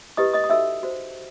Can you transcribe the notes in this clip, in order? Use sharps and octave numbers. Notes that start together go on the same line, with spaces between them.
E4 G4 B4 D#5 D#6
D#5 D#6
D#6
D#4 F#4 A4 E5 E6
F#4 C5